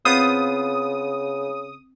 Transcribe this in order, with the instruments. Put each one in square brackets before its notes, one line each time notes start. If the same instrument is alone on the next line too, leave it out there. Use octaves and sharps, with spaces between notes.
[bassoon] C#3 [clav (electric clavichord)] B3 F4 C5 [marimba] C4 [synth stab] D#6